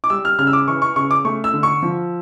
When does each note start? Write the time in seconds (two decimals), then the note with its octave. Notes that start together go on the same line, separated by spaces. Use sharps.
0.04 D6
0.10 G3 E6
0.25 F6
0.38 C#3 F6
0.47 E6
0.53 D6
0.68 E3 C#6
0.82 C#6
0.96 C#3 C#6
1.11 D6
1.25 A3 C#6
1.44 E6
1.53 D3
1.63 C#6
1.83 F3